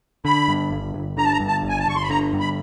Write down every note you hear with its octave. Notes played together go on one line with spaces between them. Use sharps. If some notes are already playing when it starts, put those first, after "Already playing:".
D3 B5
G2
G1
G1
D3 A#5
A5
A#5
G2
A5
G1
G#5
A5
G1 C#6
C6
B5
D3 A#5
G2
B5